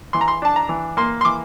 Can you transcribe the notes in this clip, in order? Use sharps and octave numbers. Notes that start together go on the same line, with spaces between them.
E3 C6
A#5
C6
D4 A5
A#5
E3
A#3 C6
C6
E3 D6